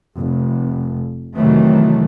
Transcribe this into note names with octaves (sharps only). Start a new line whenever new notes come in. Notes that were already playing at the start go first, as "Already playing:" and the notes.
F1
F2 C3 D#3 E3 F#3 A3